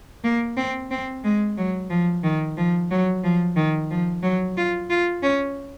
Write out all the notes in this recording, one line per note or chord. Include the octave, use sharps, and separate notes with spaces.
A#3
C4
C4
G#3
F#3
F3
D#3
F3
F#3
F3
D#3
F3
F#3
F4
F4
C#4